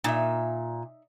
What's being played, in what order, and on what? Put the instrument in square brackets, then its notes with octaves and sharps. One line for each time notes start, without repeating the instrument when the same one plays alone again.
[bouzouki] A#2 [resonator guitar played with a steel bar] D#4 E5